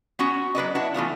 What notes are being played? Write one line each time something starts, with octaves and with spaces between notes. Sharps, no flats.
B3 C#4 F#4
F#3 B4 D5 D#5
D4 E4 F#4
E3 A3 B3 F4